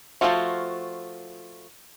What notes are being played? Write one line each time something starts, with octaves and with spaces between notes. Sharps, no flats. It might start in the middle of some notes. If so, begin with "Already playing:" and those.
F3 G#3 A3 F4 F#4